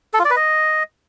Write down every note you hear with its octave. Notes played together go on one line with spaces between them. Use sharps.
A4
F4
D5
B4
D#5